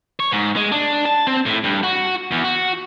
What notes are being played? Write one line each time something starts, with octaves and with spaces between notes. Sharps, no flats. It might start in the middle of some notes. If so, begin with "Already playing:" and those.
C#5
G#2
G#3
D4
A5
C4
A2
G2
F#4
E2
F#4